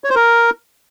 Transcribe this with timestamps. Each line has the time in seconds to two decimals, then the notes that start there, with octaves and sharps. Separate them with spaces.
0.04 C#5
0.10 C5
0.15 A#4